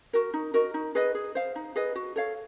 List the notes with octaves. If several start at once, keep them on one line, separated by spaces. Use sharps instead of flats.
F#4 A#4
D#4
F#4 A#4 D#5
D#4
G#4 B4 D#5
G#4
C5 F5
D#4
G#4 B4 D#5
F#4
A4 C#5 F5